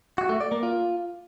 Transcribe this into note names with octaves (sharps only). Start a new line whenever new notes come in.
F#4
A3
D5
A#3
F4